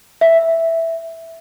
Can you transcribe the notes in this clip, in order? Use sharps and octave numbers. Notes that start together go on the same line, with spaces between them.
E5